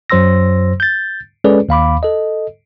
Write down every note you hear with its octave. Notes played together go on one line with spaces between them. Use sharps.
F#2 F#3 C5 C6 E6 A#6
G6 A6
G#3 C#4 G#4 A4 B4 D5
D#2 F5 B5 D6
A4 D#5